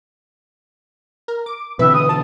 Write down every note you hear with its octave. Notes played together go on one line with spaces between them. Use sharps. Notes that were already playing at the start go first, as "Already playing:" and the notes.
A#4
D6
B2 D3 E3 C4 B4 E5
D#6
A5